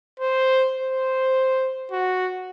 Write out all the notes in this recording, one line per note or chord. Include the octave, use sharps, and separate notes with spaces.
C5
C5
F#4